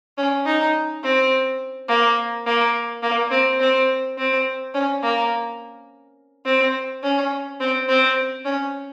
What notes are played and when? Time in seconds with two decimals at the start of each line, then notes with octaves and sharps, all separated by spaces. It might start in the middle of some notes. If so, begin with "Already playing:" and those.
0.18 C#4
0.46 D#4
1.03 C4
1.88 A#3
2.46 A#3
3.03 A#3
3.31 C4
3.60 C4
4.18 C4
4.74 C#4
5.03 A#3
6.45 C4
7.03 C#4
7.60 C4
7.88 C4
8.45 C#4